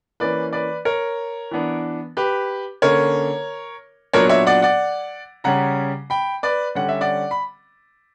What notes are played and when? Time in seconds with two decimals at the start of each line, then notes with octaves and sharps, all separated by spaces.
0.20 E3 A#3 C#4 B4 D5
0.53 B4 D5
0.85 A#4 C#5
1.51 E3 B3 D4
2.17 G4 B4
2.82 D3 A#3 C#4 A#4 C#5
4.13 A#2 F#3 B3 D4 A#4 C#5
4.29 C#5 E5
4.47 D5 F#5
4.62 D5 F#5
5.44 C#3 G3 C#4 F#5 A#5
6.10 G5 B5
6.43 B4 D5
6.75 D3 G3 C#4 F#5
6.89 E5
7.01 D5 F#5
7.31 B5